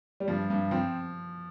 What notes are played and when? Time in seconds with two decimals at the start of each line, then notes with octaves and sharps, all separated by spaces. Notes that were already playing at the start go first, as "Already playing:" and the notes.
0.20 G3
0.28 G2 F3
0.50 G2
0.71 F3 C4